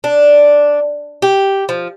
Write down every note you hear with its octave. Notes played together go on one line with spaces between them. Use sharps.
D4
G4
F3